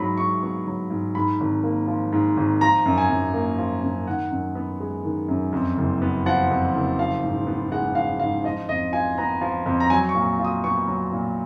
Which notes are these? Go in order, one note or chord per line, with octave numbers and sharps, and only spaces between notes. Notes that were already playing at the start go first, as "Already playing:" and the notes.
Already playing: G#2 F#3 B5
G#2 C#6
B3 C#6
F#3
G#2
G#2 B5
G#1
A#3
F3
G#2
G#1
F3 A#5
F#2
G#5
F#2
A#3
F3
F#2
D#3 F#5
F#2
B3
G#3
D#3
F#2
F2
F#1
B3
F3 F#5
F2
F#1
F3 F5
G#2
B3
G#3 F#5
F3 F5
G#2 F5
F3 D#5
F2 D#5
F4 G#5
B3 A#5
F3
F2
A#5
F#3 G#5
C#6
A#2
F4
D#6
B3 C#6
F#3
A#2